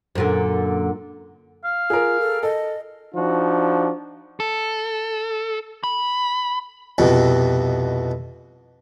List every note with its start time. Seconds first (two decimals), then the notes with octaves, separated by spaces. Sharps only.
0.15 F#2 A#2 D3
1.65 F5
1.90 F4 G#4 A#4
2.20 A4
2.43 A4 D#5
3.14 F3 D4 D#4 F#4
4.40 A4
5.84 B5
6.98 C2 F2 B2